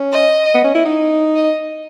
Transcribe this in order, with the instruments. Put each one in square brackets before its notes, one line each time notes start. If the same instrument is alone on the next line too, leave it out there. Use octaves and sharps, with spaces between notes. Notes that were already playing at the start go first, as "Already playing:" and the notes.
Already playing: [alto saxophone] C#4
[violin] D#5
[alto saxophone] B3
C#4
E4
D#4
[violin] D#5